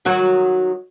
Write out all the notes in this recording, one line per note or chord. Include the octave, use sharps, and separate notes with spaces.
D#3 F#3 F#4